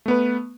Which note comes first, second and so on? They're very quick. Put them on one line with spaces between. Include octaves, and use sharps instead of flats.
A3 B3 B4